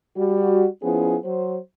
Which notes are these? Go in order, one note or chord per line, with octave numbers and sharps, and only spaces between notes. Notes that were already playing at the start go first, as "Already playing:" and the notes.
G3 F#4
F3 B3 C#4 E4 G#4
F#3 C5